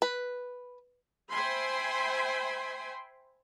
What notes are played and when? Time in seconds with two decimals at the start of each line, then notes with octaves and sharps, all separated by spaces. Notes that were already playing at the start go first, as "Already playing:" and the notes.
0.02 B4
1.30 C5 E5 G5 G#5 B5 C6